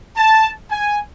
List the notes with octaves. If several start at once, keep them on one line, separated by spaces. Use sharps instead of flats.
A5
G#5